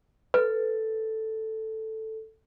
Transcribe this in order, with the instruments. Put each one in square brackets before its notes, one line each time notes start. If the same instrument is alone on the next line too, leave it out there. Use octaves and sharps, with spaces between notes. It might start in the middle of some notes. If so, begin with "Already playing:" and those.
[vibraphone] A4 [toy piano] B4